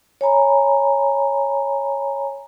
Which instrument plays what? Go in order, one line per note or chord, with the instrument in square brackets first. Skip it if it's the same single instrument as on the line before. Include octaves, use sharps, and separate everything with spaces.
[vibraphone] C#5 G#5 A#5 B5